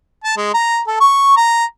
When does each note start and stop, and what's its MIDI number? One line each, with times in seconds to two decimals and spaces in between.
0.24 0.36 81
0.37 0.52 56
0.54 0.80 82
0.87 0.98 69
1.00 1.35 85
1.37 1.65 82